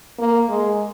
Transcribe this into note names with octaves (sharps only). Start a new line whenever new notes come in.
A#3
G#3